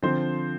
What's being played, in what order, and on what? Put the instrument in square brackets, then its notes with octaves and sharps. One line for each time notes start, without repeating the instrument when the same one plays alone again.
[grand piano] D3 F3 C4 C5